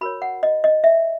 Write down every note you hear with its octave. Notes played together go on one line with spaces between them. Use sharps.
F#4 A#4 C#5 B5
F#5
D#5
D#5
E5